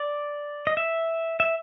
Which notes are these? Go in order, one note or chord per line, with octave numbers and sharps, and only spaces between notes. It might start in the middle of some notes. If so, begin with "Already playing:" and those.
Already playing: D5
D#5
E5
E5